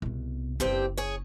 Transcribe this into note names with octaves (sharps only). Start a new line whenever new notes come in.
C2 B2
F#1 G2 C4 E4 G4
G#4 C#5